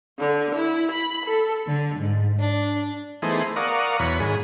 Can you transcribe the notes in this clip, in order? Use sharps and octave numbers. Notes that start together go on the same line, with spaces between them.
D3
E4
B5
A4
D3
G#2
D4
E3 A3 B3 D#4 G#4 C5
A#4 D5 F5 F#5 C#6 D#6
E2 B2 C#5 B5
G#2 D#3 G#4